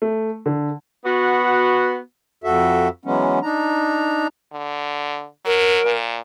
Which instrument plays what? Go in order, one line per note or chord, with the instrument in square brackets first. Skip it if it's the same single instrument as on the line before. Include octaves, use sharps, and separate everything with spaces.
[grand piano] A3
D3
[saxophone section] B3 F#4
[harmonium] F2 F#4 A4 E5
E3 F#3 G#3 B3 C#4
D4 D#4 A#5
[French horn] D3
[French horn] F#3 [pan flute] A#4
[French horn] A#2